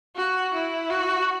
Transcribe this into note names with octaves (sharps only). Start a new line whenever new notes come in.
F#4
E4
F#4